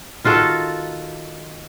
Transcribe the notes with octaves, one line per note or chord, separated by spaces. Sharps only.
D#3 F4 F#4 A4